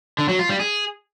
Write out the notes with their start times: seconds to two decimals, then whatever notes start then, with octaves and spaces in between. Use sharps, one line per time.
0.18 D3
0.29 F#3
0.39 F4
0.49 G3
0.59 G#4